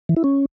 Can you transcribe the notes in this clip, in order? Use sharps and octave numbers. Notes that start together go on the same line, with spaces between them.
E3
E4
C#4